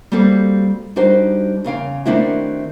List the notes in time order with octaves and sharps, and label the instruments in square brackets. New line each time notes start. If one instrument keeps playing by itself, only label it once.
[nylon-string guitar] G3 A#3 C4 F#4 A4
G3 D4 D#4 F#4 C5
E2 C#3 F5 G5
D#3 A3 C4 D4 E4 F#4